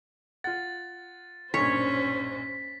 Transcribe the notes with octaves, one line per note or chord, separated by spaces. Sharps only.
F4 F#5 A6
B1 G2 A#2 C#4 C5 C#5 B6